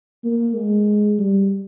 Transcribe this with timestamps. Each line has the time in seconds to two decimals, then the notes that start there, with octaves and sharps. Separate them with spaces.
0.24 A#3
0.55 G#3
1.19 G3